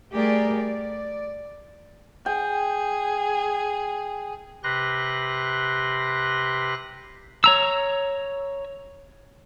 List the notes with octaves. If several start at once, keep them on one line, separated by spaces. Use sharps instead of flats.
G3 A3 G4 G#4 A#4 D5
D5
G#4 G5
C3 G4 B4 C6 F#6 A#6
C#5 A#5 E6